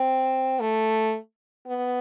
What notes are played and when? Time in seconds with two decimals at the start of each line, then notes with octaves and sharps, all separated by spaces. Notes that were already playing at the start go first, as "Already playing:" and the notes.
Already playing: C4
0.60 A3
1.67 B3